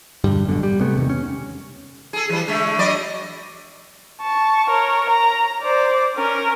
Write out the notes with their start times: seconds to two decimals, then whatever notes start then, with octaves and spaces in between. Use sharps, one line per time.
0.24 E1 G2 D3 G3
0.47 A1 F#2 B2 D3
0.63 G3
0.81 C3 G#3 A3 B3
0.95 E2 C3 D#3
1.10 C#4
2.13 G#4 A4
2.29 E3 G3
2.47 D3 G#3 A3
2.78 F#3 D5 D#5
4.21 A5 C#6
4.69 A#4 C#5
5.10 A#5
5.63 C5 D5
6.15 C#4 A#4